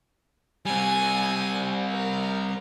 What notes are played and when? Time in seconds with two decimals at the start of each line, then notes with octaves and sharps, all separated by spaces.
0.66 G3 C4 G#5
1.91 A#4